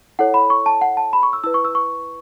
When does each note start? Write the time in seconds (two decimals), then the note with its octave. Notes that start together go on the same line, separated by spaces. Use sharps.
0.19 E4 A4 C#5 F#5
0.34 B5
0.50 C#6
0.66 A5
0.81 F#5
0.97 A5
1.13 B5
1.23 C#6
1.33 E6
1.44 E4 B4 E6
1.54 C#6
1.65 E6
1.75 C#6